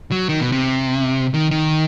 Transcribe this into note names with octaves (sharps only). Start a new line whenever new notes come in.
F#3
D#3
B2
C3
D#3
D#3